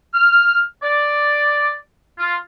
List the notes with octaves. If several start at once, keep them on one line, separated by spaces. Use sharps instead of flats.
F6
D5
F4